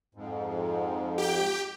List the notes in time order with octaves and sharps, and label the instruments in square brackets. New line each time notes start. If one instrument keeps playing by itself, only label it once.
[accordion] F2 G#2
[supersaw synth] G4 G5